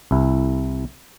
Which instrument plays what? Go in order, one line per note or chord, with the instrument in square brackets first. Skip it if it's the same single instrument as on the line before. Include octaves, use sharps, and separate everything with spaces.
[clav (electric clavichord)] C2 E4